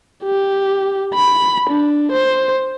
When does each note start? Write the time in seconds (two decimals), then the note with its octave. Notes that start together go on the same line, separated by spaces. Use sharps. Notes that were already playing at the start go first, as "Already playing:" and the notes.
0.25 G4
1.14 B5
1.70 D4
2.12 C5